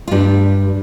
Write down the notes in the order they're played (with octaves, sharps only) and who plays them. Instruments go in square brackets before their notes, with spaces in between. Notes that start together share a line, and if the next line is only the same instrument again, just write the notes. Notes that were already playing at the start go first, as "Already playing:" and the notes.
[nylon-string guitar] F4
G2 G3 D4